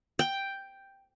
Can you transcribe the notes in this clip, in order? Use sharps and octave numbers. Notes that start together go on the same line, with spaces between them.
G5